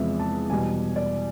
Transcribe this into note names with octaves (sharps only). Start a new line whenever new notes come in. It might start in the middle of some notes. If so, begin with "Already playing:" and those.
Already playing: E2 C3 F3 G#3 B3 E5
A5
E2 B2 G3 G#5
D5